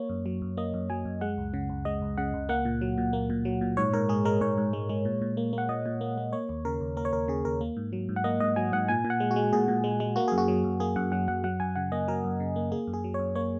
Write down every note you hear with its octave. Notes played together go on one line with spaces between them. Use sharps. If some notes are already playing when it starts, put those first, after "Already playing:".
Already playing: A#3 C#5
F#2
F#3
F#2
A#3 D#5
F#2
F#3 G#5
F#2
G#3 F#5
C#2
C#3
C#2
G#3 D#5
C#2
C#3 F#5
C#2
A#3 F#5
A#2
F#3
A#2
A#3
A#2
F#3
A#2
G#2 C#5
G#2 A#4
G#3 G#4
G#3 A#4
G#2 C#5
G#2
G#3
G#3
A#2
A#2
A#3
A#3
F#5
A#2 D#5
A#2
A#3
A#3
A#3 C#5
D#2
C#3 A#4
D#2
A#3 A#4
C#5
D#2 A#4
C#3 G#4
D#2 A#4
A#3
G#2
F#3
G#2
F#5
A#3 D#5
G#2 D#5
F#3 G#5
G#2 F#5
A#2 G#5
A#2
F#5
G#3
F#4
G#3
A#2 G#4
A#2
G#3
G#3
A#3 F#4
F#2 G#4
F#4
F#3
F#2
A#3 G#4
F#2 F#5
F#3 F#5
F#2 F#5
F#3 F#5
F#2 G#5
C#3 F#5
A#3 D#5
F#3 A#4
F#2
C#3
A#3
A#3 G#4
F#2
G#4
F#3
F#2 C#5
A#3 C#5